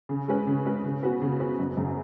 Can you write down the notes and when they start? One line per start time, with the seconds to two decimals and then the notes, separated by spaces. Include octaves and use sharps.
0.09 C#3
0.28 G#3 C#4 B4
0.47 C#3
0.65 G#3 C#4 B4
0.84 C#3
1.03 B3 F#4 B4
1.22 C#3
1.40 B3 F#4 B4
1.59 F#1
1.77 F#2 C#3